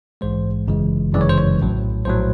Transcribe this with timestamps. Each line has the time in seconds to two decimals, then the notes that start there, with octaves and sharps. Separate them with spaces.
0.21 A#1 G#2 E3 G#3 C5
0.68 G1 F#2 C#3 E3 G#3
1.13 G1 F#2 C#3 E3 G#3 D5
1.21 C#5
1.29 C5
1.38 C#5
1.60 A#1 A2 F#3
2.05 A#1 A2 F#3 C5